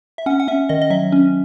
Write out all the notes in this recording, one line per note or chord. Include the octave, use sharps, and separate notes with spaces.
E5
C#4 F#5
F#5
C#4 E5
D#3 D#5
D#5
F#3 E5
C#4